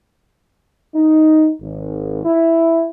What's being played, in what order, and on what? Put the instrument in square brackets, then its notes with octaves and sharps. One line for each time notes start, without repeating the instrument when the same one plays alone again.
[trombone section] D#4
G#1
E4